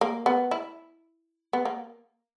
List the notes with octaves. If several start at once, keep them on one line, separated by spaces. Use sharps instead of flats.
A#3
B3
E4
B3
A#3